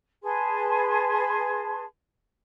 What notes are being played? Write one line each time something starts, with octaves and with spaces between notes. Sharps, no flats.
G#4 B4 A5 C6